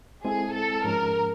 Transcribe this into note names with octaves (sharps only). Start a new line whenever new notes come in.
G#3 C4 E4 G#4 A4
A4
G#2 F3 G#3 C#4 A#4